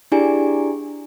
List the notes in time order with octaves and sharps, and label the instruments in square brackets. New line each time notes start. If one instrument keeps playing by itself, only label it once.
[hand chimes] D4 E4 G4 G#4 D5 G#5